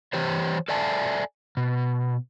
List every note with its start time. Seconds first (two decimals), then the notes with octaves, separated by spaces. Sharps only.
0.13 E3 G4 C5 C#5
0.68 A4 D5 E5 G#5 A5
1.57 B2